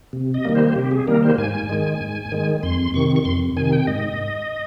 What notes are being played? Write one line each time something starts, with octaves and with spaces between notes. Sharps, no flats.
C3
D#5
D#3 G3 A#3
C5
C3 G4
G#4
D#3 G3 A#3 A#4
C5
G#2 G#5
D#3 G#3
G#2
D#3 G#3
F2 C6
C3 D#3 C#6
C#6
F2 C6
C3 D#3 G#5
G5
G#2 D#5